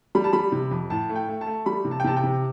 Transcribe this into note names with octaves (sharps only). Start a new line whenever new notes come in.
G3 B5
A5
G3 B5
C3
F2
A2 A5
A3
G5
A3
A5
A3
G3 B5
C3
A5
G5
C3 A5
G5
C3